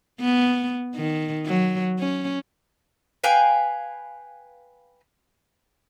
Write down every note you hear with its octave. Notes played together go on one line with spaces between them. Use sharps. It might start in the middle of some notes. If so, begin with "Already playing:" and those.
B3
D#3
F#3
C#4
B4 F5 G5 G#5